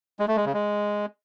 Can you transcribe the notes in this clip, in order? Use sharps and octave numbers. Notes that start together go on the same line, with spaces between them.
G#3
A3
G#3
C#3
G#3